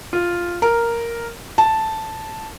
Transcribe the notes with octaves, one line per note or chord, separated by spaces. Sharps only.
F4
A#4
A5